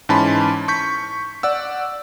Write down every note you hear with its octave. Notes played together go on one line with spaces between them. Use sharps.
G#2 E3 C#4 A5 B5 C6
C#6 G6 B6
D5 F#5 E6